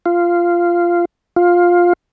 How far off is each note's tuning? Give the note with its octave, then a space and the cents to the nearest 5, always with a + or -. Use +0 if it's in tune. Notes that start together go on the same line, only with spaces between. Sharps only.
F4 -10
F4 +10